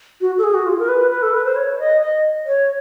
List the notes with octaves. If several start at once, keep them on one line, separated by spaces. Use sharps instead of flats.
F#4
A4
G#4
F#4
F4
A#4
B4
B4
A4
B4
C5
C#5
D#5
D#5
C#5